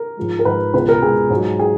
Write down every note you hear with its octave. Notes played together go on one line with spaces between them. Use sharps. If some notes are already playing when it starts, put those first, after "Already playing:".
Already playing: A#4
G#2 F3 G#3
A#4
G#2 F3 G#3 B4
C#2 B2 G#3 B4
A#4
C#2 B2 G#3 G#4
G#2
F#3
G#4